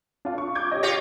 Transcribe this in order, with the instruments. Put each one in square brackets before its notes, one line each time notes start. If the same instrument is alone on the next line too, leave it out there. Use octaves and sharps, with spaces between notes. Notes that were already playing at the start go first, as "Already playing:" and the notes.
[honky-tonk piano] D4 F4
C#6
D6 G6 G#6
G4 C#5 D#5
[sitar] F4 G4 C#5 [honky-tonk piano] A#6 B6